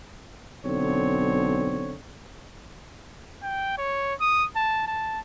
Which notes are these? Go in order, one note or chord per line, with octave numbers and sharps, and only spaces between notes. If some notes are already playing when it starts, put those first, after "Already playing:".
B1 D3 C4 C#5
G5
C#5
D#6
A5
A5